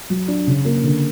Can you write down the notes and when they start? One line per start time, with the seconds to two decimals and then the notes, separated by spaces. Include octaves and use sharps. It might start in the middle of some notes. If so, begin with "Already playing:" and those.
0.10 F#3
0.28 D4
0.47 C#3
0.65 A#3
0.84 D3